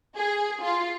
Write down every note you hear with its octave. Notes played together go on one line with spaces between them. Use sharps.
G#4
F4